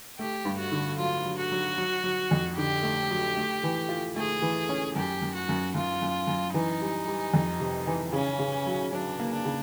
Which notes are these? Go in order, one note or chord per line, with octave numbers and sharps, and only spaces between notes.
A3 G4
G2
F#4
D3
F#3 F4
F#3
F#4
F#3
F#3
F#3
F2
D3 G4
A3
F#3
A3
E3
F4
A3 G#4
E3
C#4
F#2 G4
F#2
F#4
F#2
F#2 F4
F#2
F#2
E3 D#4
G3
G3
F2
C3
E3
C#3 C#4
C#3
F#3
F#3 D4
A#3
D4
C#3